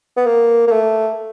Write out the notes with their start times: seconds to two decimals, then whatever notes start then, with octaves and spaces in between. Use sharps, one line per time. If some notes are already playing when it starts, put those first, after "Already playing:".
0.17 B3
0.26 A#3
0.68 A#3
0.72 A3